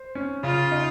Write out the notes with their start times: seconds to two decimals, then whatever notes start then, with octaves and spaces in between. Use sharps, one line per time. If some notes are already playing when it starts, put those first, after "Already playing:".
Already playing: C5
0.15 C#4
0.43 C#3 F4
0.72 D#4